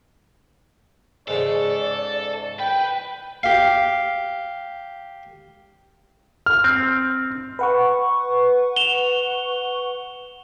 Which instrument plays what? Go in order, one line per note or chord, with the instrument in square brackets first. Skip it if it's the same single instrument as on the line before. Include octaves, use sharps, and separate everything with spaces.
[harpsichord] G#2 C#3 G#4 [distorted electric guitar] A4 [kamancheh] D5
[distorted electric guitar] B4 B5 [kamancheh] G5
[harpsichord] G4 F5
[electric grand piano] F6
[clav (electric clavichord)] C4
[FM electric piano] B4 F#5 C#6
[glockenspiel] E7 F7 G7